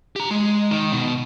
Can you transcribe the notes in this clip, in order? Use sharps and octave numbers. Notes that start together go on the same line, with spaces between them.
G4 A#5
G#3
D#3
B2